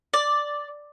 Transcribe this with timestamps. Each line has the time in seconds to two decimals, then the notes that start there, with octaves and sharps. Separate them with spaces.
0.13 D5